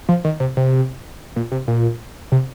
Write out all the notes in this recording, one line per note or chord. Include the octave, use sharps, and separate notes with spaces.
F3
D#3
C3
C3
A#2
C3
A#2
C3